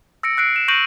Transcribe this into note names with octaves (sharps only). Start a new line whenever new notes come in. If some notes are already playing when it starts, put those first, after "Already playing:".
E6 A#6 C#7 D7
E6 F#6 C7 D7
E7
C#6 G6 A#6 D7 D#7 F#7